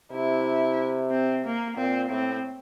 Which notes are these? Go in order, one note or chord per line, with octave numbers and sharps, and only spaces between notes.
C3 E4
C4
A#3
A#2 C4
A2 C4